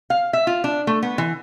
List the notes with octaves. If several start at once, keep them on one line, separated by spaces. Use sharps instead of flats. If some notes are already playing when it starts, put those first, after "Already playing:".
F5
E5
F4
D4
A3
B3
E3